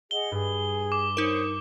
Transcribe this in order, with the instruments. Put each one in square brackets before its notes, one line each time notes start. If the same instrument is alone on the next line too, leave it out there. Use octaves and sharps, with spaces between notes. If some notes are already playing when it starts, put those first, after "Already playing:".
[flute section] G#4 D#5 F#5 [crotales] G7
[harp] G2 [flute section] G#4
[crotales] D6
[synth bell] D#4 A#4 [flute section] C5 C#5 D#6